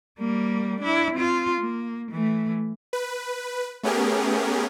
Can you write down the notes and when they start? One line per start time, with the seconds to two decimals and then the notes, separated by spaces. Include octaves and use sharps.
0.19 G3 A#3
0.80 D4 E4
1.14 C4 F4
1.60 A#3
2.11 E3 A3
2.93 B4
3.83 A3 B3 C#4 G4 G#4 A#4